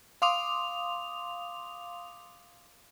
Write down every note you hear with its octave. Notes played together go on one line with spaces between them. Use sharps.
F5 C6 D6 D#6 F7